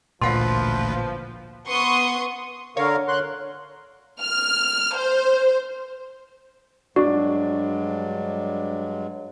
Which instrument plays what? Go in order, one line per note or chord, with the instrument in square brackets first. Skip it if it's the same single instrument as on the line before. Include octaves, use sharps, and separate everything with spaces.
[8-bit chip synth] A1 D2 B4 [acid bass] A#2 [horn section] F3 [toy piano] F5 F#5 C6
[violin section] B3 C6 C#6 D#6
[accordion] D3 A#4 F5 [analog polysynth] C#5
[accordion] C6 F#6
[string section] F6
C5
[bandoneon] G2 F#3 G#3 [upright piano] D4 [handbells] F#4